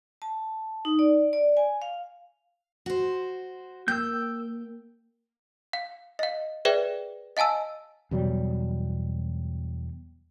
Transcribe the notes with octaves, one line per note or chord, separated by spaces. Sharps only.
A5
D#4
D5
D5
G#5
F5
F#4 C5
A#3 G5 E6 G6
F5
D#5 F5
G#4 B4 C5 D5 E5 G5
D#5 F5 G#5 A5 E6
E2 B2 F#3 G3